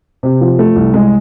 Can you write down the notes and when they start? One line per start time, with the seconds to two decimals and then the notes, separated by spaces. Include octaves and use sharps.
0.23 C3
0.41 F3
0.59 A3
0.76 C2
0.94 G#3